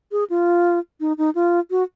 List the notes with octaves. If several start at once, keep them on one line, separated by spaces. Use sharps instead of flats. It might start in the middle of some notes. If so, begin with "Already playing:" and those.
G#4
F4
D#4
D#4
F4
F#4